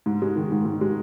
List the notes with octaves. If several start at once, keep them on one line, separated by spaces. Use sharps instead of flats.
G#2
G#3
D#3
G#2
G#2
G#3